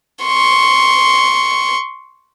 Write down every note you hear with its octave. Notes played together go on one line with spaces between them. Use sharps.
C6 C#6